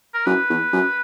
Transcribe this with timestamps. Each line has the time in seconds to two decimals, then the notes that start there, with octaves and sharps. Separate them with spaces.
0.14 A#4
0.26 F#2 B4
0.50 E2
0.73 F#2